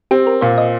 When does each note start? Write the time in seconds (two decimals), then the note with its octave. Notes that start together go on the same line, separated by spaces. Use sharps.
0.11 C4 G4
0.27 A#4
0.41 A#2 C5
0.58 D#5